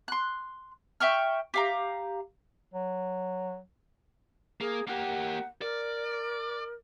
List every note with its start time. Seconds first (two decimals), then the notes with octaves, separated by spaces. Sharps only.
0.08 C6 F#6
1.00 E5 G5 C#6 F6
1.54 G4 F5 A#5
2.74 F#3
4.61 A#3 G#4
4.87 A#3 G4 F#5
5.62 A#4 D5